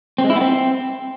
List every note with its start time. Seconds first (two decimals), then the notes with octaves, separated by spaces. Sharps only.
0.18 C4
0.24 G#3
0.30 E4
0.36 B3
0.41 C4